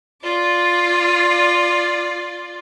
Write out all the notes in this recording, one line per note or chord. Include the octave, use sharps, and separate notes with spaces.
F4 D5